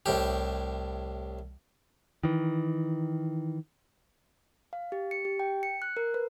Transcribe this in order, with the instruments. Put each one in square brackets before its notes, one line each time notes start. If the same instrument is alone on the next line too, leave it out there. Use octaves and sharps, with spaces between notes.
[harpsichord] C2 A2 G4
[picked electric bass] D#3 E3
[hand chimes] F5
G4
C#7
G4
G5
C#7
F#6
A#4
B4